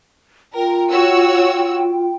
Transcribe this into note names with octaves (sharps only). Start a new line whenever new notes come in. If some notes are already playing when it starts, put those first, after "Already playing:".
F4 A#4 G5
F#4 C#5 E6